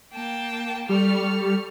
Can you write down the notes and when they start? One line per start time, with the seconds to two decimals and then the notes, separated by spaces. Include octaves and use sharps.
0.14 A#3 G5 A5
0.89 G3 A4 C#6 F6